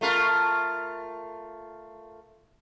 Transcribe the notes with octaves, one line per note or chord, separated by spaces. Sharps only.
A3 F4 A#4